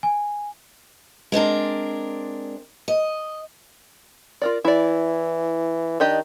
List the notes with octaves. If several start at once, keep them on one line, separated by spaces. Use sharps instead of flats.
G#5
G#3 C4 D4 A#4
D#5
F4 A#4 D5
E3 E4 D5
D#3 D4 G4 D#5